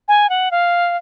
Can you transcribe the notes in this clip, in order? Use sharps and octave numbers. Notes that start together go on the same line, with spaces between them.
G#5
F#5
F5